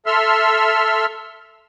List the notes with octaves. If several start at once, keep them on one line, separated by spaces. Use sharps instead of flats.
A4 E5 C6 E6 F6